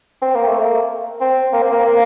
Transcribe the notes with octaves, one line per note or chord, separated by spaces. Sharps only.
C4
A#3
A3
A#3
C4
A#3
C4
A#3
A#3